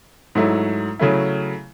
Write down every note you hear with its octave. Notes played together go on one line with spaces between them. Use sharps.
G#2 F#3 A3 E4
C#3 F#3 A3 E4